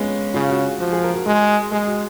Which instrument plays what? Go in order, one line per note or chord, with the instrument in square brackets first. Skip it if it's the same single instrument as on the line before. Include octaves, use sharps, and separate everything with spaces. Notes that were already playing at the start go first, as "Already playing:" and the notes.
Already playing: [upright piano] G#3 B3 C#4 F4
[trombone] C#3 [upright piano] F4
[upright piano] F#4
[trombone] F3 [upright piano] F#4
[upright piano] G#4
A#4
F#4
[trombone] G#3 [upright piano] F#4
[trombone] G#3 [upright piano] G#4
[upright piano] F#4